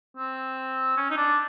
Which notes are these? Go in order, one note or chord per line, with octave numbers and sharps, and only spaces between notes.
C4
C#4
D#4
D4